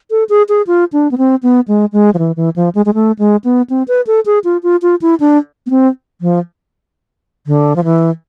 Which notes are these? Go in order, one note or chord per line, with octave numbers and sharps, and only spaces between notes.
A4
G#4
G#4
F4
D4
B3
C4
B3
G#3
G#3
F3
E3
E3
F3
G#3
G#3
A3
G#3
B3
C4
B4
A4
G#4
F4
F4
F4
E4
D4
B3
C4
F3
D3
F3
E3